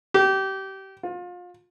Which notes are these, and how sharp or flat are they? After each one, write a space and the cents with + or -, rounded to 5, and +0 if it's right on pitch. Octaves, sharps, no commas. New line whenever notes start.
G4 -25
F4 +30